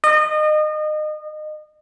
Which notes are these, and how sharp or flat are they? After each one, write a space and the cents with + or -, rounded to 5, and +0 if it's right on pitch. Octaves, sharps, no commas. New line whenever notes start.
D#5 -30